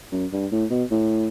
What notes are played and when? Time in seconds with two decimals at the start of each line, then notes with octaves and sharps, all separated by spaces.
0.12 F#2
0.33 G2
0.52 A2
0.70 B2
0.91 A2